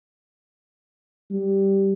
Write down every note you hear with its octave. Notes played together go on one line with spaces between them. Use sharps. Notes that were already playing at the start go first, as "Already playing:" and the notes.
G3